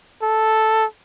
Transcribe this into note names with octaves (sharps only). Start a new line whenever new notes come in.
A4